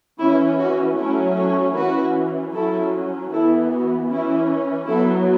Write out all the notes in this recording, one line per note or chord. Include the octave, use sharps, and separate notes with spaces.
E3 C#4 E4
F#4
F#3 A3 C#4 E4 A4
A4 C#5
E3 C#4 F#4 B4
F#3 C#4 E4 A4
E3 B3 E4 A4
F#4
E3 C#4 E4
F#3 B3 E4 A4